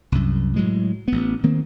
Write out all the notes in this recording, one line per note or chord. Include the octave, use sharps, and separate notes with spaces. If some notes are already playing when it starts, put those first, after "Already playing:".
C2 F#2
A2 F#3 G#3
A1 B3
D#3 A#3 C4